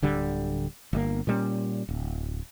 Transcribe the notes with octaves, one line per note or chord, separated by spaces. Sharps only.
D1 D3 G3
G1 E3 A#3
A#2 G3 A3 C#4
D1